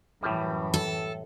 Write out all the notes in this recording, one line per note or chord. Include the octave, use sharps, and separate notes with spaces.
F#2 A2 E3 G3
A4